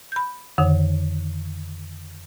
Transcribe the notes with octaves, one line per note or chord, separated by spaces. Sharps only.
B5 G6
F2 D3 D#3